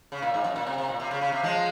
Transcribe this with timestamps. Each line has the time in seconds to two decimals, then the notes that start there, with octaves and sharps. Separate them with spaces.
0.12 C#3
0.22 A#2
0.34 G#2
0.44 F#2
0.56 A#2
0.67 C3
0.78 C3
0.89 A#2
1.00 C3
1.11 C#3
1.22 C#3
1.32 C3
1.43 F3 G#3